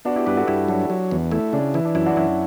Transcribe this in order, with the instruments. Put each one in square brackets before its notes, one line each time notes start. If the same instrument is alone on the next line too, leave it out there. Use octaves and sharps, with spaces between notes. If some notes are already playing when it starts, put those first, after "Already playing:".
[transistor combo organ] B3 [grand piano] D4 F#4
[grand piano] E4 G4
[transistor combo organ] G2 [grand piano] G4 B4
[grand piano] F#4 A4
[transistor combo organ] G2 [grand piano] E4 G4
[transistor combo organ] F#3 [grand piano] D4 F#4
[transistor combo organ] F#3
E2
[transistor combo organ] A3 [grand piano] E4
[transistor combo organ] C#3 [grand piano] D4
[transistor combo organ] E3 [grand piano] E4
[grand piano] D4
[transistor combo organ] F#2 [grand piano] E4
[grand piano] D4 F#4
[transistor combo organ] F#2 [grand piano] E4